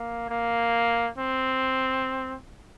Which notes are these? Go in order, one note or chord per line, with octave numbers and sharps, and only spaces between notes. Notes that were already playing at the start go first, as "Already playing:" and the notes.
Already playing: A#3
A#3
C4